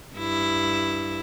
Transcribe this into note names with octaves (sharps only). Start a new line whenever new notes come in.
G2 E4